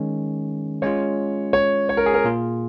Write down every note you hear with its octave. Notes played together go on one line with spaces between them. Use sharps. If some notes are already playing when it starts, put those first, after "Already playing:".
Already playing: D#3 G#3 C#4
G#3 C#4 F4 C#5
C#5
C#5
A#4
G#4
A#4
A#2 A#3 F4 G#4